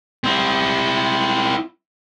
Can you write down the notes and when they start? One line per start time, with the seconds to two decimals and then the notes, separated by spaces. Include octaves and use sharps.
0.24 C4 E4